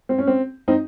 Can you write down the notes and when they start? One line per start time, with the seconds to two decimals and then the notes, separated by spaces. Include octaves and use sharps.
0.09 C4
0.18 C#4
0.27 C4
0.68 C4 D#4